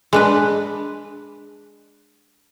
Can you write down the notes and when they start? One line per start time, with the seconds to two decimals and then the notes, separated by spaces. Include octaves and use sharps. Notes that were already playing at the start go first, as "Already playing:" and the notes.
0.13 G#3 D4 B4